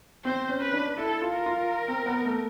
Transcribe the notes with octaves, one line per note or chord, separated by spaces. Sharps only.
C4 C5
C#4
B4
D4
E4 A4
F4
A#4
F4
C4
B3
A3